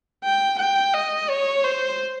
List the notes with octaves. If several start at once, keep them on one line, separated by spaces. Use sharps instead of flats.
G5
G5
D#5
C#5
C5